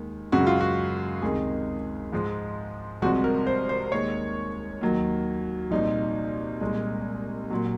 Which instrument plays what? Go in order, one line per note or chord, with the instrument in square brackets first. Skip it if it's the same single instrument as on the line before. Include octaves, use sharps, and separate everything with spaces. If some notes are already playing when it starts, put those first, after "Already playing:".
Already playing: [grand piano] D#2 D#3 G#3
F#2 C#3 G#3 F#4
F4
F#4
C#2 C3 D#3 G#3 G#4
G#2 F3 G#3
C2 C3 F3 G#3 F#4
A#4
C5
C5
D#2 D#3 G#3 C#5
D#2 D#3 F#3
C2 A#2 F3 D#4
C2 A#2 G#3
A#2 F#3